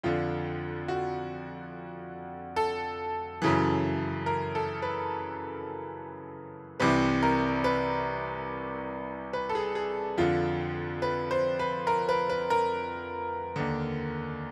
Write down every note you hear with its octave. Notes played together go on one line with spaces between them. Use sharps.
F2 D3 F4
F#4
A4
F#2 C#3 E3
A#4
A4
B4
C2 C3 E3 B4
A#4
B4
B4
A4
G#4
G#4
F2 D3 F4
B4
C5
B4
A#4
B4
B4
A#4
D#2 D3